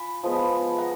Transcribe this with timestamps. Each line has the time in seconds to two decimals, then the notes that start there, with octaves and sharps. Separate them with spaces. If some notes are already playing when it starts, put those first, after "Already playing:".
Already playing: F4 G#5 B5
0.23 F3 G#3 B3
0.78 F#5 A#5